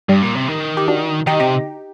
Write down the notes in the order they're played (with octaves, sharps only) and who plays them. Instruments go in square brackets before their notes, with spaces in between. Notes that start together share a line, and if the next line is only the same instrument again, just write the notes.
[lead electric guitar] G2 [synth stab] G3
[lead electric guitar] A#2
C3
D#3
[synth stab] G4
D4 F#4
[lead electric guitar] D#3 [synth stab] D#4 G4
[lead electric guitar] C3 [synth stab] D#4 G4